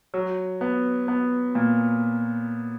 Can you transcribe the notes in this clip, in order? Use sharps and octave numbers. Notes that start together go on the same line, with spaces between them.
F#3
B3
B3
A#2